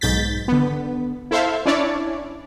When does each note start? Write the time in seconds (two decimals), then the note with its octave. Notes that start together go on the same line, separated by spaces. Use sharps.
0.01 B1 G#2 G6 A6 B6
0.48 D3 B3
1.31 E4 A4 C5 E5 F5
1.66 C#4 D4 E4 C#5 D5